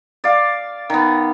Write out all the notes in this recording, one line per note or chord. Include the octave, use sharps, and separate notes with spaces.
D5 F5
D#3 B3